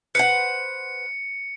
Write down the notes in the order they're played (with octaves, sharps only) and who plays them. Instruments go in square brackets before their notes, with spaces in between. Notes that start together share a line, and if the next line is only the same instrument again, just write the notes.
[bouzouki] B4 C5 F#5 [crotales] C#7